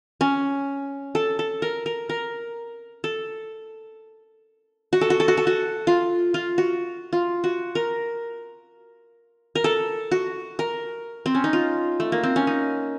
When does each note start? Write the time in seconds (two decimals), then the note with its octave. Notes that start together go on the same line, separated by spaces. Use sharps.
0.21 C#4
1.15 A4
1.39 A4
1.62 A#4
1.86 A#4
2.09 A#4
3.04 A4
4.93 F#4
5.01 A4
5.10 F#4
5.20 A4
5.28 F#4
5.37 A4
5.47 F#4
5.87 F4
6.34 F4
6.58 F#4
7.13 F4
7.44 F#4
7.75 A#4
9.55 A#4
9.64 A4
10.11 F#4
10.59 A#4
11.26 C4
11.35 C#4
11.44 D#4
11.53 F4
12.00 A3
12.12 A#3
12.23 C4
12.36 C#4
12.47 D#4